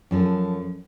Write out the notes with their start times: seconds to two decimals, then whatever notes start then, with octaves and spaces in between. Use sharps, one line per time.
0.11 F#2 F3 A4